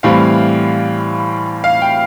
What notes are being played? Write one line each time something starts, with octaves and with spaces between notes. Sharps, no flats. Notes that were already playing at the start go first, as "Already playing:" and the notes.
A2 E3 G3 C4 F5
F5
G5